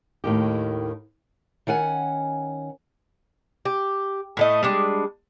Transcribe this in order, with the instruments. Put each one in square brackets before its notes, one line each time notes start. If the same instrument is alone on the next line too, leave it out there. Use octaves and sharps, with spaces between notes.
[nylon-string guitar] D#2 A2 D#3 G4
[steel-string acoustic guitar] D#3 C#4 F#5 G#5
[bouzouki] G4
A2 A3 D#5
G3 G#3 D4